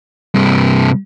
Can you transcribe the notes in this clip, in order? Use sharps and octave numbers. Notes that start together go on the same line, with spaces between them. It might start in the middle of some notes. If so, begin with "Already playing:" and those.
G2 C3